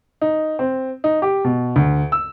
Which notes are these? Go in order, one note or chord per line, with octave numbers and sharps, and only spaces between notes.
D#4
C4
D#4
G4
B2
D2
E6